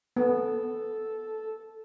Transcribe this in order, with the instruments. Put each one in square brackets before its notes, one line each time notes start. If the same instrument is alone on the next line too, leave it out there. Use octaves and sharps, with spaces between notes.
[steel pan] B3 [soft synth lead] A4